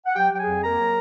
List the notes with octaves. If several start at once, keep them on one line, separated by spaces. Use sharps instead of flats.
F#5
F#3 G4 G5
F#3 G5
G#4 G#5
F2
A#3 A#4 A#5
F#3